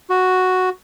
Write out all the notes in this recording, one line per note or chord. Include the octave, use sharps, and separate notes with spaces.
F#4